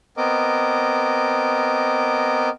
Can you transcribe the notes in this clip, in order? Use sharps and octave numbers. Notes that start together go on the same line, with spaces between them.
B3 C4 A#4 D#5 D6